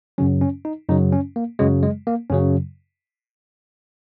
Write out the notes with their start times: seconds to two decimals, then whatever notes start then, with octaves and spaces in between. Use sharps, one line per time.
0.18 F#2 C#3 F#3 C#4
0.41 C#4
0.65 D#4
0.89 F#2 C#3 F#3 D#4
1.12 C#4
1.36 A#3
1.59 F#2 C#3 F#3 G#3
1.83 G#3
2.07 A#3
2.30 F#2 C#3 F#3 C#4